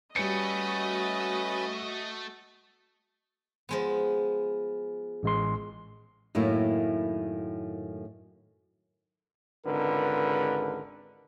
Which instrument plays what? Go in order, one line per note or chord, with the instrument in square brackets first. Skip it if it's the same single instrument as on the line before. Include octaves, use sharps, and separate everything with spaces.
[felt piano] G3 C#7 [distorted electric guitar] A3 [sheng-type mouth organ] C#4 B4 [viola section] F#4 D#5
[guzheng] F3 G#3 B3
[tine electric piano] A1 G#3 C6
[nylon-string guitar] F#2 A2 D#3 A3 A#3 E4
[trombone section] G#1 C#2 D3 A#4 B4